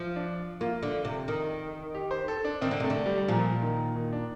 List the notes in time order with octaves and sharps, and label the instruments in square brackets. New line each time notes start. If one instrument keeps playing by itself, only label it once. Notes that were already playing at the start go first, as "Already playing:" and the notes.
Already playing: [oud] F3
[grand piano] D4
[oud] A#3 [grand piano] F4
[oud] D3
C3
D#3
[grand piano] G4
C5
A4
D4
[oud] D#3 [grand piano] C4
[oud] D3
[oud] C3 [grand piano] A3
[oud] D3
[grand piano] G3
G3
[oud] A#2 [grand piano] F3
[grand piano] D#3
D#3
D4